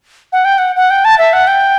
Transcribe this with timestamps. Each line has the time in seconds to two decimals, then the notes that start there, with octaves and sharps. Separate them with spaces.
0.32 F#5
0.45 G5
0.58 F#5
0.76 F#5
0.90 G5
1.05 A5
1.18 E5
1.33 F#5
1.47 G5